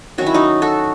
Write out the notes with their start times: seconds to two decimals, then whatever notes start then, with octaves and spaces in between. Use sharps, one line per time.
0.18 D#3 F#3 C#4 F#4
0.26 E4
0.34 D#4 F#4
0.62 F#4 A4